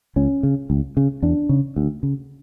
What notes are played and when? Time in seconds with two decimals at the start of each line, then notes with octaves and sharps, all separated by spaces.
0.16 C#2 C#4
0.43 C#3
0.70 C#2
0.97 C#3
1.22 E2 D4
1.49 C#3
1.76 D2
2.03 C#3